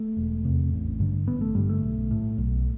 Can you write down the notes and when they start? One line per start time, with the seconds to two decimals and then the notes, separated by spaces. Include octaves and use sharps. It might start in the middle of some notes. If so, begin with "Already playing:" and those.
Already playing: A3
0.17 E1
0.45 E2 C3
0.72 A1
1.00 G2 D3
1.28 A1 B3
1.41 A3
1.55 G2 D3 G3
1.69 A3
1.83 B1
2.11 A2
2.38 B1